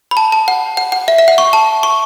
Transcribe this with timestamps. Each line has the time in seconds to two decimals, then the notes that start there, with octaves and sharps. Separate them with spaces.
0.11 B5
0.17 A5
0.32 A5
0.48 F#5
0.77 F#5
0.92 F#5
1.08 E5
1.18 E5
1.28 F#5
1.38 C#6
1.53 A5
1.83 C#6